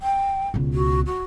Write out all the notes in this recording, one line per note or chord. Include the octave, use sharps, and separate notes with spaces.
G5
C#2 B2
F#4
F#4